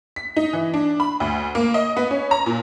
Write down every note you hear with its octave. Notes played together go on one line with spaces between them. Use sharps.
B6
D#4
E3
D4
B5
D2
A#3
D#5
B3
C#4
A#5
A#2